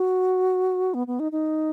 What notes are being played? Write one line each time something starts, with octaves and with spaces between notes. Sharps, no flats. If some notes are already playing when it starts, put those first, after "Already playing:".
Already playing: F#4
B3
B3
D#4
D#4